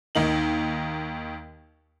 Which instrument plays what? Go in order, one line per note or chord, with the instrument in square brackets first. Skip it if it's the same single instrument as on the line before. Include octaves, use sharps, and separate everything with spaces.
[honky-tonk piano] D#2 A#3 D#4 F#7